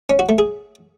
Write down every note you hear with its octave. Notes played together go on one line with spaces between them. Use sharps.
C#4
F#4
A3
G#4